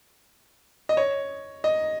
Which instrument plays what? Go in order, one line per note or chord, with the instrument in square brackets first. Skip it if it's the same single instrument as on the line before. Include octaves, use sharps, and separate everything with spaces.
[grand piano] D#5
C#5
D#5